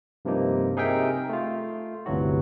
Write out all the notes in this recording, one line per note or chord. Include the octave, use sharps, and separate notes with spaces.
G2 C3 F3 A#3 D#4
C3 D#4 G#4 A#4 E5 G5
A3 F4
G1 D2 C3 E3 F#3 F#4